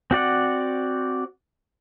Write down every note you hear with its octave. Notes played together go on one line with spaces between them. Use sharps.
C4 F#4 D5 F#5